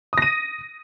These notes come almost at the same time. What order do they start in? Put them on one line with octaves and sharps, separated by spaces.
D#6 A#6 D#7